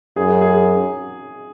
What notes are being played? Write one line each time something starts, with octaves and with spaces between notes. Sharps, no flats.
F#2 G#4
G#4